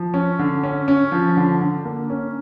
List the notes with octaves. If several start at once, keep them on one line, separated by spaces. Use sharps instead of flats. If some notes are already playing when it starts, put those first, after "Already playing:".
Already playing: F3
C#4
D3
C#4
C#4
F3
D3
D3
A#3
C#4